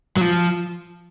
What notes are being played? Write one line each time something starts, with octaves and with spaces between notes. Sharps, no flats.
F#3
F3